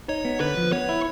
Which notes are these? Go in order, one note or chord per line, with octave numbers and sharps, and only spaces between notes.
D#4 C#5
B3
D3 B4
F3
B3 C#5
E4